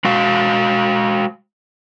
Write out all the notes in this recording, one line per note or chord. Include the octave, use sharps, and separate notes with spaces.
G#3 F#4 F5